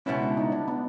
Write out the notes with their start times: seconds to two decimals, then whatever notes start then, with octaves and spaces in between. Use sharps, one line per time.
0.06 C#2 B2 G3 B3 C#4 E4
0.22 D4
0.37 D#4
0.52 D4
0.68 B3